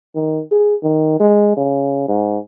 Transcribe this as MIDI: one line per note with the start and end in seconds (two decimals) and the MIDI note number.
0.15 0.42 51
0.52 0.75 68
0.83 1.17 51
1.19 1.55 56
1.57 2.03 49
2.08 2.38 44